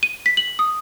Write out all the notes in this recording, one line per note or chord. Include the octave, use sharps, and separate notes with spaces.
D#7
B6
F#7
D#6